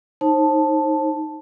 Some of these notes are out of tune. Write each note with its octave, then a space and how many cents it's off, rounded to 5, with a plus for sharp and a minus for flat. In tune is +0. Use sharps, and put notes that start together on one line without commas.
D#4 +0 C5 +35 A5 +0